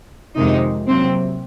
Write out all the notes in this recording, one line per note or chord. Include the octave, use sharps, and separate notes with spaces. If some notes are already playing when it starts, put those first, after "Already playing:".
F2 C3 D#3 G#3 D#4
C3 F#3 A#3 C4